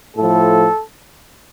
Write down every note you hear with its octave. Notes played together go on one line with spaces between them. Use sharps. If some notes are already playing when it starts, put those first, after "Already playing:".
A2 F3 A4